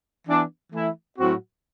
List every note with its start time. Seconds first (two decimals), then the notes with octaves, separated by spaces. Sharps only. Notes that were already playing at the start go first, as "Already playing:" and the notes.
0.26 E3 B3 D4
0.71 E3 A3 E4
1.18 A2 F#3 C4 F#4